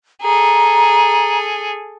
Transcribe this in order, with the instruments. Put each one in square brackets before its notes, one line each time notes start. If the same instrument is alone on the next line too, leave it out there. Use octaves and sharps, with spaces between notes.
[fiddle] G#4 A4 [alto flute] A#5